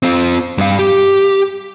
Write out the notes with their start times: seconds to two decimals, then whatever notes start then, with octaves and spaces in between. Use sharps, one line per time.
0.03 C4 F4
0.58 G2 F5
0.79 G4